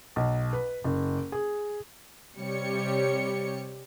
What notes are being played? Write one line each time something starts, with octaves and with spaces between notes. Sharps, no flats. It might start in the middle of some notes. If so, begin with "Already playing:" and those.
B1
B4
F#1
G#4
C3 G3 G4 C#5 C#7